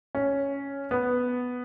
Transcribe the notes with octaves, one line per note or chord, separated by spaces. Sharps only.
C#4
B3